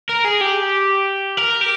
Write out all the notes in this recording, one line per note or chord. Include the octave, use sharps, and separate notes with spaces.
A#4
G#4
G4
A#4
G4